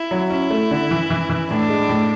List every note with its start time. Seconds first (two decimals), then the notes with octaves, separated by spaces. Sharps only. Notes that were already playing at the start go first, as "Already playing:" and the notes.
Already playing: E4
0.11 F#3
0.31 C#4 E4
0.50 A3
0.71 D3
0.91 E3
1.10 E3
1.30 E3
1.50 A2 D4
1.69 G#3
1.89 A2